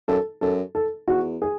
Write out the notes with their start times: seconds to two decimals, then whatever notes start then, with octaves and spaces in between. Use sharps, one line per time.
0.08 F#2 A4
0.41 F#2 A4
0.75 A4
1.08 E2 F#4
1.42 G#4